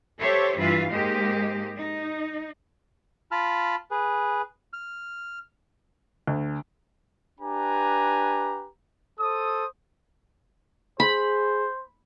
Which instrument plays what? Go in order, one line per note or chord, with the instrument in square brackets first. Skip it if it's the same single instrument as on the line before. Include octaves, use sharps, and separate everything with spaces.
[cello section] G4 A4 C5 C#5 E5
G2 E3 F4 B4 E5 F5
G#2 G#3 A#3 G4 C5 D#5
D#4
[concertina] F4 A5 B5 F6
G#4 B4
F6
[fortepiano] D2
[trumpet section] D4 G4 B4 G#5 A#5
A4 C5 D#6
[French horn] G#4 [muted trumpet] C5 [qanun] B5